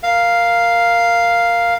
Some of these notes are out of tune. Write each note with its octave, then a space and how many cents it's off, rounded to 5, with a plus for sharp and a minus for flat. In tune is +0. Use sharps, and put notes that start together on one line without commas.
A#4 +0 F5 +0